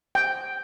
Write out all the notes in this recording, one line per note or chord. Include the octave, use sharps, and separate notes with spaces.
G5